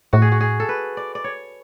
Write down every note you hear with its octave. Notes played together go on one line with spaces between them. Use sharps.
A2 F#4
G#4
F#4
G#4
A4
B4
D5
D5
C#5